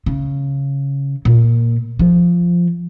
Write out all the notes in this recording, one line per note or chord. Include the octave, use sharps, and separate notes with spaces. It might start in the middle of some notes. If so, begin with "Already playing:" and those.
C#3
A#2
F3